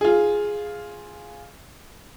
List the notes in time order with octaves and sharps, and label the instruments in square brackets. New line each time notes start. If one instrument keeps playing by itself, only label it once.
[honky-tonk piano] F4 G#4